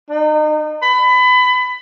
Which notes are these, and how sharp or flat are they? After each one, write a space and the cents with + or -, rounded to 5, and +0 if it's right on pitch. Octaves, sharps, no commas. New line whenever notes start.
D#4 -35
B5 +25